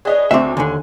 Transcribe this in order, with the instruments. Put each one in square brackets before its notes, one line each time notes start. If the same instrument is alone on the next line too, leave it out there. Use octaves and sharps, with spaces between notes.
[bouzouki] D4 B4 C#5 [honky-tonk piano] G#4 D#5
[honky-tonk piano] D2 D6 [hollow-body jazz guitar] C4 E5 [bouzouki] D#4 G#4 C#5
[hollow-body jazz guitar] D#2 D3 [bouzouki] C5 [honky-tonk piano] G#5